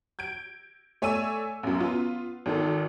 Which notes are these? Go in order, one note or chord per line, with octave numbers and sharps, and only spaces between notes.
G6 G#6 D7
A3 C#5 D5 G#5 E6 D#7
A1 F#2
B3 F4
G#1 D#3 A4